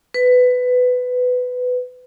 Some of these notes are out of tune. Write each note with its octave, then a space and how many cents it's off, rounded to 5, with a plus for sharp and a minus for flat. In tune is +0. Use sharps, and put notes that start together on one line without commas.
B4 +15